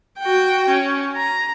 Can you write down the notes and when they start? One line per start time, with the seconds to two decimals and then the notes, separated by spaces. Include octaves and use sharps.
0.20 F#4 G5
0.69 C#4
1.17 A#5